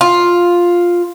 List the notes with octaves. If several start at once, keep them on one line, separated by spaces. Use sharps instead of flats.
F4